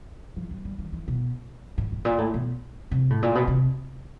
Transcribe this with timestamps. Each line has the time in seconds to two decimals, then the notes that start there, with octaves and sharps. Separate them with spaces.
0.36 F3
0.51 F#3
0.65 G3
0.78 D#3
0.92 E3
1.08 B2
1.78 A2
1.92 A2
2.05 A#2
2.18 A2
2.34 B2
2.91 C3
3.10 A2
3.23 A#2
3.35 B2
3.48 C3